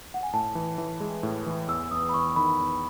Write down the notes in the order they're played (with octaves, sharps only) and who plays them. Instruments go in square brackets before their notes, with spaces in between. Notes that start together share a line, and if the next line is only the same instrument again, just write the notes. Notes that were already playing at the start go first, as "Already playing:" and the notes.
[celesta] F#5
G#5
[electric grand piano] A2 [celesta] A5
[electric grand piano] E3
E3
G#3
A2
E3
[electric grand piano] E2 [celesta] E6
[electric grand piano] E2 [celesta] D#6
[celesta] B5
[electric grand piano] E2 [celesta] C#6
[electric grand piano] D#3 [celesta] B5
[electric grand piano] E2